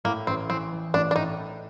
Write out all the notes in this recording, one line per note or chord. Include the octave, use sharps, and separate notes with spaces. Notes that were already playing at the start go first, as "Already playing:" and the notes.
A2 A#3
A1 C4
E3 C4
E3
A1 D4
D4
A2 D#4